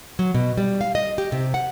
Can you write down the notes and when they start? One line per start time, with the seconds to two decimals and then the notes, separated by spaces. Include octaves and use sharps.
0.19 F#3
0.34 B2
0.58 G3
0.81 F5
0.95 D#5
1.18 G4
1.32 C3
1.54 F#5